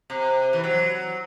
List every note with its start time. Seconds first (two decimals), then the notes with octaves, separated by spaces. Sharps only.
0.10 C3
0.53 E3
0.64 F#3